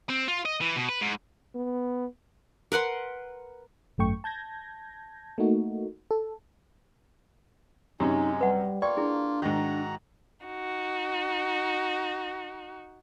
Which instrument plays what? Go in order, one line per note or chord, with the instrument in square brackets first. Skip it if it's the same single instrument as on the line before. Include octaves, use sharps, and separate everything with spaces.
[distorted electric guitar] C4
F4
D#5
E3
B2
B4
G#2
[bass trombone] B3
[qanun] A#4 B4 F#5 C6
[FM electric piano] G#1 F#2 A3 G5 C#6
A5 G6 G#6 A#6
A3 A#3 D#4 F#4
A4
[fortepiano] F#2 C3 C#4 [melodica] G#3 [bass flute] D#4 [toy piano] G4
[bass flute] G3 [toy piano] B4 F#5
[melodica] A#3 F4 [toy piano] D5 G5 [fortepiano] C#6
[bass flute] D4 [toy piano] E4 G#4
[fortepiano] G#2 D#3 [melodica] F#4 A#5
[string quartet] D#4 F#4